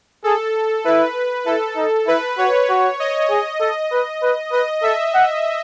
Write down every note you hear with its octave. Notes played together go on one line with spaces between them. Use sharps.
G#4 A4
E4 B4
E4 A4
D#4
E4 B4
F#4 C#5
F#4
D#5
G#4
A4 D#5
B4
B4
B4 D#5
A4 E5
F#5